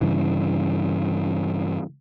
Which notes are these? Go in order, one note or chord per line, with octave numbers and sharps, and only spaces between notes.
G2 C#3 E3